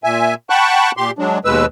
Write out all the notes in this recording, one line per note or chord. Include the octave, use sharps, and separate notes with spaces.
A#2 E5 G#5
F#5 G5 A5 B5 C#6 F#6
A#2 G4 C6
F#3 G#3 D4
D#2 B2 G#3 B4 E6